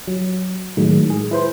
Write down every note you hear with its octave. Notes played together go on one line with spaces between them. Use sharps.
F#3
A2 D#3 F#3 G#3
G#4
E4 B4 C5